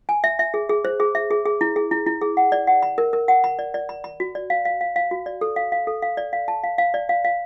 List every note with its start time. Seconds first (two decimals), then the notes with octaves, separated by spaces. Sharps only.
0.09 G#5
0.24 E5
0.39 E5
0.54 G#4
0.69 G#4
0.85 C5
1.00 G#4
1.15 E5
1.31 G#4
1.46 G#4
1.61 E4
1.76 G#4
1.91 E4
2.07 E4
2.21 G#4
2.37 F#5
2.52 D5
2.67 F#5
2.83 B5
2.98 A#4
3.13 A#4
3.28 F#5
3.44 B5
3.59 D5
3.74 D5
3.89 B5
4.04 B5
4.20 F#4
4.35 D5
4.50 F5
4.65 F5
4.81 F5
4.96 F5
5.11 F#4
5.26 D5
5.41 A4
5.56 F5
5.72 F5
5.87 A4
6.02 F5
6.17 D5
6.33 F5
6.48 A5
6.64 F5
6.78 F5
6.94 D5
7.09 F5
7.25 F5